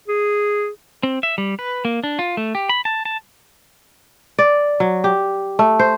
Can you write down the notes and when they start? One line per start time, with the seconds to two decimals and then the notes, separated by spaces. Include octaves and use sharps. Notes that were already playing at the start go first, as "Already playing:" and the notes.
0.08 G#4
1.03 C4
1.23 E5
1.38 G3
1.59 B4
1.85 A#3
2.04 D4
2.19 F4
2.37 A3
2.55 G4
2.69 B5
2.85 A5
3.05 A5
4.38 D5
4.80 F#3
5.04 G4
5.59 A3
5.79 C5